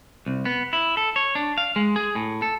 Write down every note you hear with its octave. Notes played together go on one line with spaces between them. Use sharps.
C2
B3
E4
A4
C#5
D4
F5
G#3
G#4
A2
A4